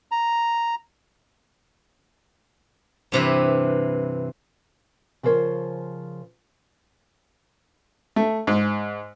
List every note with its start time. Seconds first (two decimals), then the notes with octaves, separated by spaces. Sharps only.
0.11 A#5
3.12 G2 C3 E3 B4
5.23 C#3 F3 A#4 C5 C#5
8.16 A3
8.47 G#2